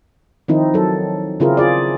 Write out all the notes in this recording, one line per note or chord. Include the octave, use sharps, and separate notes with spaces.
D#3 F3 C4 D#4 E4
F#3 A4
C#3 C4 E4 F4 G#4 A#4
F4 G#4 D5